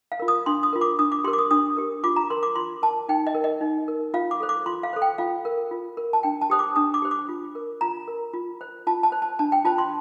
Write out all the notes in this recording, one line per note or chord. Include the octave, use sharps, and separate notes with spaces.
F5
F4 A#4
D#6
D4 C6
D#6
F4 A#4
D6
D4 D#6
D6
G4 A#4 C6
D6
D#6
D4 D#6
G4 A#4
F4 D6
A#5
A#4 C6
D6
F4 C6
A#4 A5
D#4 G5
D#5
A#4
D#5
D#4
A#4
F4 F5
D6
A4 C5
D6
F4 C6
F5
A4 C5
G5
F4 F5
A#4
F4
A#4
A5
D4 G5
A5
G4 C5 D#6
D6
D4 D#6
D6
G4 C5
D6
F4
A#4
F4 A#5
A#4
F4
C5
F4 A5
A5
C5
A5
D4 A5
G5
F4 C5 A5
C6